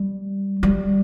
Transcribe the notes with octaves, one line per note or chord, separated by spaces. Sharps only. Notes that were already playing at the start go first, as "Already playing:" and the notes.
Already playing: G3
G3